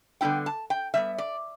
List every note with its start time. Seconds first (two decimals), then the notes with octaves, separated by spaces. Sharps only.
0.21 D3 G3 B3 E4 G5
0.46 A5
0.70 G5
0.94 A2 G3 B3 E5
1.18 D5